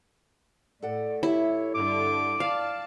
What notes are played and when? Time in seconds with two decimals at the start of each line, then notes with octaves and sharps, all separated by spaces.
0.82 A2 A4 D5 F#5
1.23 E4 G4 A4 C#5 E5
1.75 G2 D3 D6
2.40 D5 F5 A5